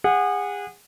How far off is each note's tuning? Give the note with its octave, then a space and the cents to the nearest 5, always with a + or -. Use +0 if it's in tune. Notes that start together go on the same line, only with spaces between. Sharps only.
G#4 -35 F#5 -15